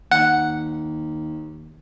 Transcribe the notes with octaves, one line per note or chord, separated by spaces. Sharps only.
D#2 F#5